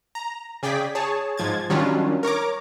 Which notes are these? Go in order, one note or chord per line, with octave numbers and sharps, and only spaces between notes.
A#5
C#3 G#4 D5 G5 B6
G#4 C#5 A5
G#2 F3 G#6 A6
D#3 F#3 G3 C#4 D4 F4
A#4 C#5 A#5 D6